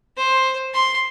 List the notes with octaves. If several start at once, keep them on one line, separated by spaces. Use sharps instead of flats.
C5
C6